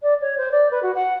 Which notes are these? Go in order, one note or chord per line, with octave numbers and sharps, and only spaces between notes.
D5
C#5
C5
D5
B4
F#4
F#5